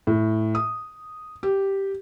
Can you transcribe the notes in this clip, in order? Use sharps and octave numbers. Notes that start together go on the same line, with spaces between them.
A2
D#6
G4